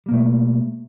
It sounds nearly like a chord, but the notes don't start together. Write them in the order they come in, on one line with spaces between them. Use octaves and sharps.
G3 A#3 B2 A3